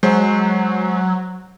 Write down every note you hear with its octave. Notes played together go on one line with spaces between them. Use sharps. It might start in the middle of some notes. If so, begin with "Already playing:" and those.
F#3 G#3 C5